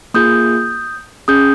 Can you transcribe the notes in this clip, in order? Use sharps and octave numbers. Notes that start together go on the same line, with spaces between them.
A#3 F4 G#4 D#6 G6
C#4 G#4 D#6 G6